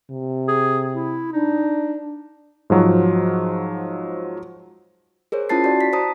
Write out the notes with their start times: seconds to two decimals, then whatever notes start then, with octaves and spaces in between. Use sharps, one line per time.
0.11 C3
0.48 G#4
0.94 E4
1.32 D4 D#4
2.70 G#2 F3 F#3 F#4
5.32 G#4 A#4 C5 C#5
5.49 C#4 E4 F4 A5 A6 C7
5.64 F#4 D5
5.81 B6
5.93 C5 A5 A#5 D#6